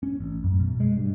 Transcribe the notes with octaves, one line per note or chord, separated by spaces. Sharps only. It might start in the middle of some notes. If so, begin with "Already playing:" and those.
C#4
A1
F#2
B2
G#3
G2